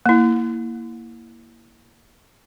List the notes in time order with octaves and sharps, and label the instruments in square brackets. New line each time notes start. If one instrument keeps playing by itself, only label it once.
[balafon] A#3 E4